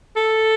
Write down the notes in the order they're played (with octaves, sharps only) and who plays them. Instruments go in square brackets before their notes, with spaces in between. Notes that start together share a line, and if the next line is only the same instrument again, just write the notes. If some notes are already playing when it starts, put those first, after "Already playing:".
[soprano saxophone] A4